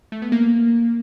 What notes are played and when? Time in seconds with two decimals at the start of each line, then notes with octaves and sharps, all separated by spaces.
0.12 A3
0.22 B3
0.32 A#3